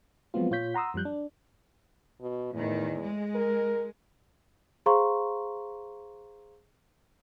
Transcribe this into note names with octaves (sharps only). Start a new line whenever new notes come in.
F3 F#3 G#3 B3 C4 F4
A#2 F4 C#5 G6 B6
F#5 A#5 C6 D#6 E6
F#2 F3 G3 F#6 G6
D4
B2
E2 A2 D#3
G#3
A#4
G#4 C5 F5 A#5 C6 C#6